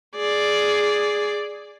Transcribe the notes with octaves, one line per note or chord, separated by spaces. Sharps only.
G#4 D5